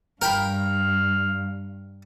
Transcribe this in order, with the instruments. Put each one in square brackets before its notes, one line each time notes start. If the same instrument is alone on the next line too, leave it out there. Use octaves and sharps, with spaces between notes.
[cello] G2 [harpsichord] A#4 G5 B5 [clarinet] F5